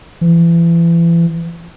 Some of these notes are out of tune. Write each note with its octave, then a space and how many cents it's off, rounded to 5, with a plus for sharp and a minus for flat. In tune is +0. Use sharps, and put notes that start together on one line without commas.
E3 +35